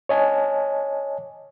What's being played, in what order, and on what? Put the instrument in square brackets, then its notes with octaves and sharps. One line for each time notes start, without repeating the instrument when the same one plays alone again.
[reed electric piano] C#5 D#5 G#5 A5